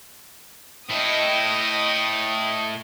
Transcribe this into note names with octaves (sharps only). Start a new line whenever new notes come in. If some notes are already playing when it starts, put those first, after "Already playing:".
A2 E4 D#5 G5 D#6